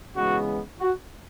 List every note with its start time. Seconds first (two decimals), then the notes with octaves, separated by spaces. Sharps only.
0.14 C#3 E3 G#3 B3 F#4
0.80 F#4